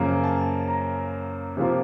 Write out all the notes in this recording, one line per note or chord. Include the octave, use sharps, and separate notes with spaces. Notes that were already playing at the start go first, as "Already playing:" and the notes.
Already playing: F#2 C#3 F3 A#3
A5
A#5
C3 F3 A#3 F4